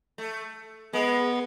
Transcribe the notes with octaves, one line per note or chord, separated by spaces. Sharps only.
A3
G#3 B3